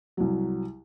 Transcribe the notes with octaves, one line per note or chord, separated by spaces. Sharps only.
C2 F#3